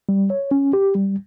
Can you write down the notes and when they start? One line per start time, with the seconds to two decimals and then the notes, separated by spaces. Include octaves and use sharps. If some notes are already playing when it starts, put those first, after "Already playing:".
0.09 G3
0.30 C#5
0.51 C#4
0.73 G4
0.95 G3